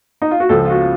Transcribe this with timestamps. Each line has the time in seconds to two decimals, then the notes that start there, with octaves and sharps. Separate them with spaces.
0.22 D#4
0.31 F4
0.40 F#4
0.49 C#2 C#3 F3 A4
0.65 F4
0.70 F#4